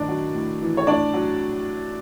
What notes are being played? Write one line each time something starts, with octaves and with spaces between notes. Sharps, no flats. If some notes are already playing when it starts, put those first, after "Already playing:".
Already playing: A2 D#3 D4 D5
F#3
A2
E3
C#5
A2 D4 D5
F#3